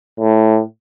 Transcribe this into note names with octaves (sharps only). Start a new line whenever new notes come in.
A2